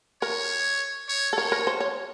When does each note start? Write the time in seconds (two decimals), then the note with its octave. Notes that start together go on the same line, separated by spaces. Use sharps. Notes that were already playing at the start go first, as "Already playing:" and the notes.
0.22 A#4 C#5
1.09 C#5
1.33 A4
1.37 A#4 C#5
1.52 A#4
1.67 C5
1.80 C#5